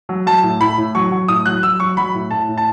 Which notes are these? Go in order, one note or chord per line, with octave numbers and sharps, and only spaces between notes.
F#3
F#3 A5
A2
A2 B5
A2
F#3 C#6
F#3
A2 D#6
F#3 F#6
F#3 E6
F#3 C#6
F#3 B5
A2
A2 A5
A2
A5